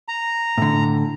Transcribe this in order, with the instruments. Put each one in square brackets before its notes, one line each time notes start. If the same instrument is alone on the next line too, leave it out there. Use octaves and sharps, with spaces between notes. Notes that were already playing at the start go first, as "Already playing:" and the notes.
[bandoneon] A#5
[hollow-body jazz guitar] A2 D3